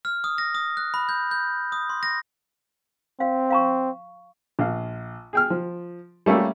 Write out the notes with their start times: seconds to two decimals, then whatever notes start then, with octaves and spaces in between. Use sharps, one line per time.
0.05 F6
0.24 D#6
0.38 A#6
0.55 D#6
0.77 F#6
0.94 B5
1.09 G6
1.31 G6
1.72 D#6
1.89 C6
2.03 A#6
3.20 C4 F5
3.50 F5 A#5 C#6
4.59 A#1 F5
5.33 G#4 G5 F6
5.50 F3
6.26 G3 A3 A#3 C#4 E5